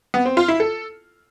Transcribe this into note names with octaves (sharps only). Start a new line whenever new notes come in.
B3
C4
F4
E4
A4